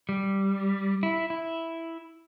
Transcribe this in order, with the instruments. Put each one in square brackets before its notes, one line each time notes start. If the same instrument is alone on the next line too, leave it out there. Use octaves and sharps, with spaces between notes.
[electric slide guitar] G3
E4
E4